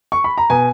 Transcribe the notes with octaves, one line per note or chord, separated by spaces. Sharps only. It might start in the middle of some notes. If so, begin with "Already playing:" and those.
C#6
B5
A#5
B2 G#5